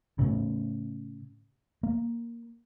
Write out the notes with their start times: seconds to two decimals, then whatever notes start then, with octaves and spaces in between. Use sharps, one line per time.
0.19 A2 C#3
1.83 A#3